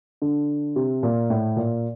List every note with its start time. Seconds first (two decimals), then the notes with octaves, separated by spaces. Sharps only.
0.22 D3
0.76 C3
1.03 A#2
1.30 A2
1.56 A#2